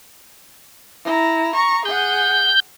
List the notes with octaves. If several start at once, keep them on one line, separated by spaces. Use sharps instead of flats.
E4 A#5
A#5 C#6
G#4 F#5 G6